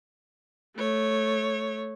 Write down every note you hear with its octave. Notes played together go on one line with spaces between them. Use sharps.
A3 C#5